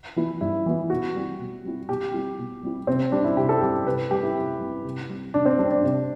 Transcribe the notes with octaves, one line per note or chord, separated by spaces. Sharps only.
E3 B3 E4
G2 E4
E3 B3 E4
B2 F#4
G3 C4 E4
B2
G3 C4 E4
B2 G4
G3 C4 E4
B2
G3 C4 E4
C3 C4
G3 C4 D4
E4
C3 G4
A4
G3 C4 G4
C3 B4
G3 C4 G4
E4
C3
G3 C4
C3
G3 C4
C3 D4
C4
G3 C4 D4
D4
C3